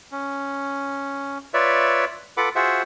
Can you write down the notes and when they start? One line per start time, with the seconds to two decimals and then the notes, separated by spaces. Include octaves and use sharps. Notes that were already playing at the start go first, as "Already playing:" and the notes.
0.12 C#4
1.54 F4 B4 C#5 D5 E5
2.37 F4 A4 B4 F#5 B5 D6
2.55 F4 F#4 G#4 C5 E5 F#5